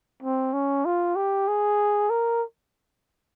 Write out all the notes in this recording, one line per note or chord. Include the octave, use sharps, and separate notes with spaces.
C4
C#4
F4
G4
G#4
A#4